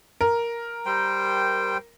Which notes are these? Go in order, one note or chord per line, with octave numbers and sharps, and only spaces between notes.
A#4
G3 C5 G5